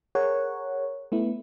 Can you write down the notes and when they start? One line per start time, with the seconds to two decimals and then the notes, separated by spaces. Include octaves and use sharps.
0.15 G#4 A#4 C#5 F#5
1.12 A3 B3 E4